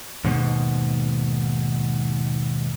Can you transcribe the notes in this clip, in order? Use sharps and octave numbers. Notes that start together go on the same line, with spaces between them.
D#2 G#2 B2